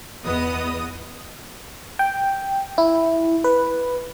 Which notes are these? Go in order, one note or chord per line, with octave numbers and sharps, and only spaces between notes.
E2 B3 D#5 D#6
G5
E4
B4